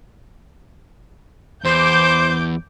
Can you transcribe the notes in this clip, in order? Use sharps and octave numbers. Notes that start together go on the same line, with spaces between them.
E2 C5 D6 G6